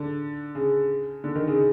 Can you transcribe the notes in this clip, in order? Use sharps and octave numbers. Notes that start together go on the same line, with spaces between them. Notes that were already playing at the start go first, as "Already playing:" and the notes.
Already playing: D3
C#3
D3
D#3
C#3